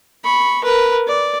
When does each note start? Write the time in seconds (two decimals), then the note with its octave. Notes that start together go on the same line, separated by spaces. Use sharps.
0.24 B5 C#6
0.64 A#4 B4
1.07 D5